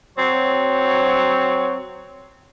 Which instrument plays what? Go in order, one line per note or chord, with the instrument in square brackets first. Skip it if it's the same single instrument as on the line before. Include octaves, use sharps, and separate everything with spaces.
[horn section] F#3 C4 C#5